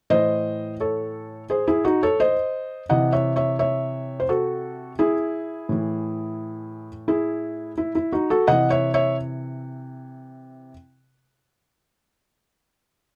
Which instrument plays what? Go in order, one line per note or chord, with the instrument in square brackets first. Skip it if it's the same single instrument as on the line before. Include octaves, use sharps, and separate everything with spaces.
[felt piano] A2 E3 C5 D#5
A4 C#5
G#4 C5
E4 G#4
D#4 F#4
A4 C#5
C5 D#5
C3 E3 D#5 F#5
C#5 E5
C#5 E5
C#5 E5
C5
F#4 A4
E4 G#4
A2 E3
E4 G#4
E4
E4
D#4 F#4
F#4 A4
C3 E3 D#5 F#5
C#5 E5
C#5 E5